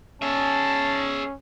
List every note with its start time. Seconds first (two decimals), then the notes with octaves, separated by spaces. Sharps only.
0.22 C#4 G#4 E5 A5